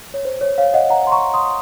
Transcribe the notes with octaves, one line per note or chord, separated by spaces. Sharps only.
C#5
C5
C#5
C#5 F5
D#5 F#5
F#5 A#5
C6
A#5 C#6
C6 D#6